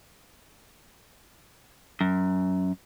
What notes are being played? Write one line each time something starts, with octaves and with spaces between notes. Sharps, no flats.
F#2